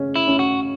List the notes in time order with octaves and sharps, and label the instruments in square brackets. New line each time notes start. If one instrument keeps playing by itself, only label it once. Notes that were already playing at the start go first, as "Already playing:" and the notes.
Already playing: [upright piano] C#3 C#4
[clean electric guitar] E4
[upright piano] C#4
[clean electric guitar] F#4